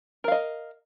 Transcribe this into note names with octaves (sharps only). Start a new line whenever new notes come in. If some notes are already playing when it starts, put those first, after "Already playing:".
A#4 D#5 F5